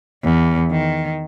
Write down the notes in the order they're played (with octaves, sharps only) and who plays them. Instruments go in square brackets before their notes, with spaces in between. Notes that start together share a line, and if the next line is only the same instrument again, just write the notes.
[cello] E2
D#3